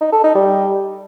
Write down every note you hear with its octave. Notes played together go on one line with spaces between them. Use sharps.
D#4
A4
D#4
G3